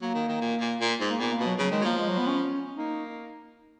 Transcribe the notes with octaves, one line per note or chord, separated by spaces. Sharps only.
F#3 A#3
D#3
D#3
A#2
A#2
A#2
G#2
A#3
A#2 B3
A#3
B2
F#3
C#3 F#3
D#3 G#3
F#3
F3 A#3
G#3
F#3
B3
C#4
A#3 D#4